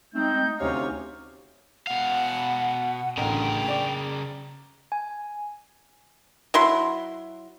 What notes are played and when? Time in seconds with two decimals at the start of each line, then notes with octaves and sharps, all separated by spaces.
0.14 G#3 A3 C4 D#4 G6
0.59 D2 C3 C#4 C#5 F5
1.87 B2 F5 F#5
3.17 A1 D2 C#3 A#4 G5
3.68 D5
4.92 G#5
6.54 F#3 E4 C6